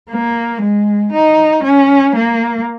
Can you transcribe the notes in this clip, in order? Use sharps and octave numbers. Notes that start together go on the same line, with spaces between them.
A#3
G#3
D#4
C#4
A#3